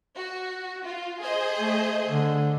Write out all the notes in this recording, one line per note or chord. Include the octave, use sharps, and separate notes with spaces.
F#4
F4
G#4 C5 D#5
A3
D3